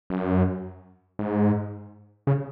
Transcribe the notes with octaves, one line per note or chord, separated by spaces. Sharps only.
F#2
G#2
C#3